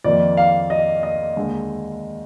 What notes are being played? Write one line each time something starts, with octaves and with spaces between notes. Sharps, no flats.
F2 D#3 A#3 D5
F5
D#5
D#5
D#2 D3 G#3